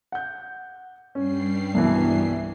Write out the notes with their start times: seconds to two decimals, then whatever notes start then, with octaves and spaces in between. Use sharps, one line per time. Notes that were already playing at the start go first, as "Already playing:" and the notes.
0.12 F#5 G6
1.15 G2 G3 C#4 C7
1.74 C2 B2 E3